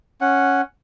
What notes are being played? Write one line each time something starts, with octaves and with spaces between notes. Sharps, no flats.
C#4 F#5